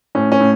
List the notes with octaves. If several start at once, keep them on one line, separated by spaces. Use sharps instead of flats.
A2 C#4
C#4
A2